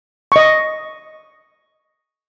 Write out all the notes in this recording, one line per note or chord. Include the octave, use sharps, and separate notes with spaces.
D#5 C#6